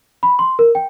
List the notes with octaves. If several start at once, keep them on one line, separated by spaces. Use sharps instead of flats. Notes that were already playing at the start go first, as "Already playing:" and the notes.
B5
C6
A#4
G5